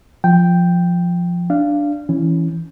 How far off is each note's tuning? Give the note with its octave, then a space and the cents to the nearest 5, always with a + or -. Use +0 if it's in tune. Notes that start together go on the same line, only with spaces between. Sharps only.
F3 +0 G5 +0
D4 +0 F5 -20
E3 +0 C#4 +0